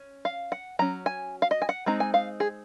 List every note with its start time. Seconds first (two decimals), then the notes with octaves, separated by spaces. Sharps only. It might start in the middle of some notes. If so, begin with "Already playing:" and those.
Already playing: C#4
0.25 F5
0.52 F#5
0.79 F#3 C#4 A#5
1.06 G#5
1.42 F5
1.51 D#5
1.62 G#5
1.69 F#5
1.86 G#3 C4 D#4 A#5
2.00 G#5
2.14 F5
2.40 G#4